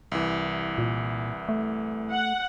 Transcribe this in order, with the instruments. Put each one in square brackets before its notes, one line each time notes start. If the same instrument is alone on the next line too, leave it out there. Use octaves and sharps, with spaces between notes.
[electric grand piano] C2 E3
[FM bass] A#2
A3
[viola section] F#5